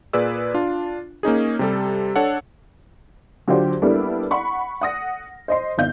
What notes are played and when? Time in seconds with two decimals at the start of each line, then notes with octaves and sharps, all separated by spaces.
0.13 A#2 G#4 B4 D5 E6
0.54 D4 F4
1.23 A#3 C#4 D#4 G#4
1.59 C3 G3 A4
2.16 D4 A4 C#5 F#5
3.48 D3 F#3 D4 F4 G4 C5
3.82 G3 A#3 B3 D4 E4 A4
4.31 F#5 B5 C#6
4.81 F#5 D#6 A#6
5.48 C5 D#5 C6
5.78 G1 D#4 F5 G6